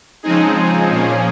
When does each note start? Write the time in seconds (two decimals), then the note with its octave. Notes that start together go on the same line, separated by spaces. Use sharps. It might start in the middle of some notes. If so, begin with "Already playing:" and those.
0.23 C#3 F3 G#3 C4 D#4 G#4
0.89 A#2 F3 A#3 C#4